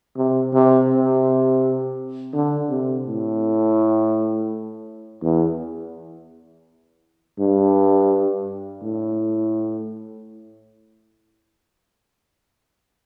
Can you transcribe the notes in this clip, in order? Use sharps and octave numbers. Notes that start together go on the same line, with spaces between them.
C3
C3
C3
D3
C3
A2
E2
G2
A2